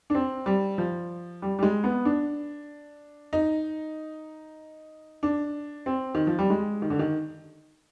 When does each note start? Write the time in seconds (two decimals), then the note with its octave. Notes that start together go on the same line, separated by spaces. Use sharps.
0.10 D4
0.15 C4
0.46 G3
0.78 F3
1.42 G3
1.59 G3
1.63 G#3
1.84 B3
2.05 D4
3.33 D#4
5.23 D4
5.86 C4
6.15 D#3
6.27 F3
6.39 G3
6.50 G#3
6.82 D#3
6.90 D3
6.99 D#3